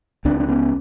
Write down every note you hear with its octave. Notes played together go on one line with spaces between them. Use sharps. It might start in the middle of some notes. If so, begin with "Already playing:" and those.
C#2 C4 D4
D4
B3 C#4